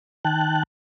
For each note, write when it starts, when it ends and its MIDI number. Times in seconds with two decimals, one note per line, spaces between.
0.25 0.63 51
0.25 0.63 79
0.25 0.63 81
0.25 0.63 90